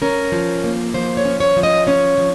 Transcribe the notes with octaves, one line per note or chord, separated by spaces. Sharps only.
C#4 A#4
F3
A#3
F3 C5
C#5
C#4
C#5
F3
D#5
C#4 C#5
F3